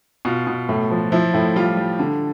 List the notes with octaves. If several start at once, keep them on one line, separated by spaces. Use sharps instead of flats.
B2 F4
B2
A2
F3
F3 E4
A2 E4
G3 F4
G3
D3